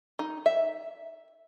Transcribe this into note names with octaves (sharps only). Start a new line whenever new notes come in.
D#4
E5